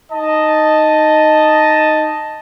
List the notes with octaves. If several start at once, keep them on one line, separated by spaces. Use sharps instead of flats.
D#4 D#5 A5